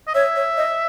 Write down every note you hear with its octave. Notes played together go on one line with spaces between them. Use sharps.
D#5
C#5 E5
C#5
D#5